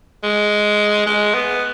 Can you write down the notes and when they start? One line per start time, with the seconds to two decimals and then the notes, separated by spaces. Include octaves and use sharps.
0.23 G#3
1.06 G#3
1.34 B3